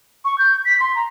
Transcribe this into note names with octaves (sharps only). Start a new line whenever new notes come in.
C#6
G6
B6
C6
A#5